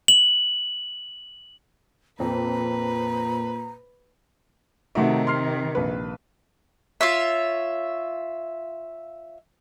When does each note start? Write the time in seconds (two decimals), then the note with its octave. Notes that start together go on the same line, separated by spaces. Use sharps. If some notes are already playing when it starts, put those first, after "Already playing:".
0.08 F#7
2.20 F2 A#2 B4 A#5
4.95 C3 D#3 A3 D#4 F#4
5.27 C6 F6 C7
5.75 A#1 B4
7.01 F4 C#5 E5